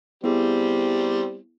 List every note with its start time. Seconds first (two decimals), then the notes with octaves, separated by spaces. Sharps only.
0.24 G3 B3 C4 E4 G#4